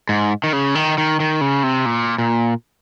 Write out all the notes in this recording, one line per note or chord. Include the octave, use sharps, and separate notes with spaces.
G#2
D#3
C#3
D#3
D#3
D#3
C#3
C3
A#2
A#2